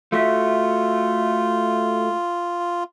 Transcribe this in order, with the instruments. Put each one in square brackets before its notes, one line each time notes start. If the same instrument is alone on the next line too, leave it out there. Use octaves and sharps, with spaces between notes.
[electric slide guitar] A3 F#4 E5 [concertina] F4